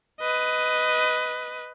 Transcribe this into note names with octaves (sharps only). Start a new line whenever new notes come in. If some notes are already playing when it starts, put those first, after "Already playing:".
B4 D#5